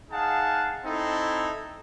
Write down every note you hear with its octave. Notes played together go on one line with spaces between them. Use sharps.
D#4 G#4 F5 F#5 A5
C4 D#4 E4 A4